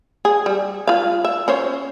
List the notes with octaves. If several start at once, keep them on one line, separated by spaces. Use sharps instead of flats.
G#4
G3
F4 F5
E5
C#4 C5 C#5